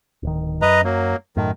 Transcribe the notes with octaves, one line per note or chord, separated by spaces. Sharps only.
D1 D#3
F#2 B4 D#5 A#5
F#3 A#3
F#2 A2 D#3